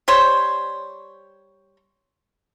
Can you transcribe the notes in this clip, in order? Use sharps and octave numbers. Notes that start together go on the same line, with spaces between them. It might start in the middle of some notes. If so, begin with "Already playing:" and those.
G3 C5 C#5